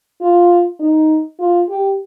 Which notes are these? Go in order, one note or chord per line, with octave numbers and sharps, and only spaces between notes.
F4
D#4
F4
G4